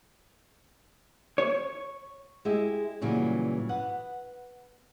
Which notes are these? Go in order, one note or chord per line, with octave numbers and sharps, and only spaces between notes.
C#5
G#3 E4 G4 G#4 E5
A#2 C#3 E3 F#3 G3
B3 B4 F#5